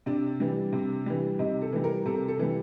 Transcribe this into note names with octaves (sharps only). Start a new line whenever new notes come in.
C3 D4
E3 G3
C3
E3 G3
C3 D#4
A4
E3 G3
A#4
C3 A4
A4
E3 G3